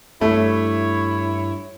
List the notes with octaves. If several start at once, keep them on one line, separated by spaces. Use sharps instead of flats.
G2 A3 E4 C#5